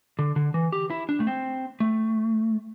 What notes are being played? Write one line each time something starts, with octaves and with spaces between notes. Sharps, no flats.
D3
D3
E3
G4
E4
D4
A3
C4
A3